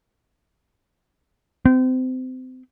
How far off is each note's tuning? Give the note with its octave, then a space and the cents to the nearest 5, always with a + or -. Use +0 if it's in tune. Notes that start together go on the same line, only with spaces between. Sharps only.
C4 -30